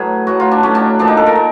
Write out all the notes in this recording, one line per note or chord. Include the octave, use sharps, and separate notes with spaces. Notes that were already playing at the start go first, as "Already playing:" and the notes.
Already playing: A2 F#3 G#4 B4
A2 F#3 F#4
F4
D4
A2 F#3 C#4
D4
A#2 F3 D4
D#4
A4
A#4
A#2